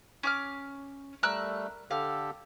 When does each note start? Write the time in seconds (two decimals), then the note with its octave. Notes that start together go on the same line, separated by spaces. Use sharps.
0.23 C#4 D6 F6
1.23 G3 A3 A#4 E6 F#6
1.91 D3 G4 A4 F5